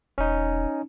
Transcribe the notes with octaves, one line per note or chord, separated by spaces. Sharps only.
E1 C#4 D#4